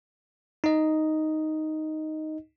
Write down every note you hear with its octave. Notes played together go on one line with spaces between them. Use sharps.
D#4 D#5